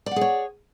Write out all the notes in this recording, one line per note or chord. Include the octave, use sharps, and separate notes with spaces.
G#4 C#5 D5 F#5